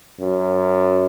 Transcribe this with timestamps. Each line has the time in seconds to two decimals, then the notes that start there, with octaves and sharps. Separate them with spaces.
0.20 F#2